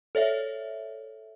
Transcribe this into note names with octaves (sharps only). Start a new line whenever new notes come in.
A4 C#5 D5 E5